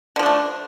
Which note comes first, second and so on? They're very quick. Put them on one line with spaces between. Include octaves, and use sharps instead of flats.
D3 F3 D4 A3